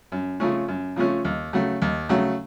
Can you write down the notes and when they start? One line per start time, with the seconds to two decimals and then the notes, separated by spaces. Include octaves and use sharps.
0.12 F#2
0.40 C#3 F3 A3 C#4
0.68 F#2
0.96 C#3 F3 A3 C#4
1.25 D#2
1.53 C#3 F#3 A3
1.82 D#2
2.09 C#3 F#3 A3